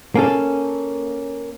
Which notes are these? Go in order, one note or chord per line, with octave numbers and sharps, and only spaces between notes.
A#3 C#4 A4